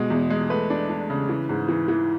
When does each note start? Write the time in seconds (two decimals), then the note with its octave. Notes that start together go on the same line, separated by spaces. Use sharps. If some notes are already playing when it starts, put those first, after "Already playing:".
Already playing: B2 G#3
0.10 E2
0.30 G#3
0.50 A3 B4
0.70 D4
0.89 D4
1.10 C#3
1.29 E3
1.49 G#2
1.69 E3
1.88 E3